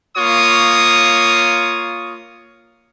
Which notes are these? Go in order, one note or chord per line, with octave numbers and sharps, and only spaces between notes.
A#3 F4 C#5 C#6 D#6